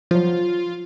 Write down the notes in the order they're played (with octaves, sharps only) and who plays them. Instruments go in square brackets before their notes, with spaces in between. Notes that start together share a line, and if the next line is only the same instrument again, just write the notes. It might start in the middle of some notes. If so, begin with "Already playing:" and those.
[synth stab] F3 F#3 [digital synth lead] F4